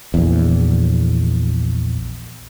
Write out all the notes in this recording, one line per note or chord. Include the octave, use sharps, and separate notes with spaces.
A#1 E2